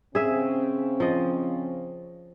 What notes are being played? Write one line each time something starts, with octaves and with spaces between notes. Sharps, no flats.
C#3 C4 C#4 G#4 E5
F3 D#5